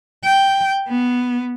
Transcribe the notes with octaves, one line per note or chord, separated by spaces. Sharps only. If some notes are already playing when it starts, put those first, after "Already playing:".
G5
B3